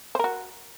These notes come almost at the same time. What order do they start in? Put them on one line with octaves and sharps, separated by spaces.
C5 A#4 F#4